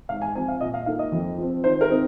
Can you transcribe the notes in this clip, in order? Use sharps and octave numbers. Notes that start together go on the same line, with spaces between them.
G#2 F5
G#5
F3 C4 G#5
F5
A#2 D#5
F5
A#3 D#4 F5
D#5
F2
F3 C4
D#3 C5
A#4
C4 D#4